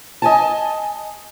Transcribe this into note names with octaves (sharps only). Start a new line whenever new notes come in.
D#5 G#5 A5